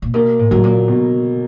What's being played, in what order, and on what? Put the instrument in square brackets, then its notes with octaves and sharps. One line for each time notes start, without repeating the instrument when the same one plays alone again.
[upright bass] A#2
[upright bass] B2 [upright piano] A#3
[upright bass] A2
[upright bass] A2 [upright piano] F#3
[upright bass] A#2
[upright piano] B2